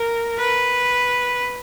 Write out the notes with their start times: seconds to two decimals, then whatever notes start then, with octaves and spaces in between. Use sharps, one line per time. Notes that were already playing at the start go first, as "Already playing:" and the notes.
Already playing: A#4
0.38 B4